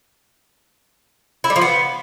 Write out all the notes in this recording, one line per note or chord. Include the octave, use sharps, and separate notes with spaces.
E4
G3
F3
B3